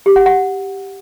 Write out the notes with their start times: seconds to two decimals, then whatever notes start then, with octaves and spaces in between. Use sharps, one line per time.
0.06 G4
0.16 F#5
0.26 F#5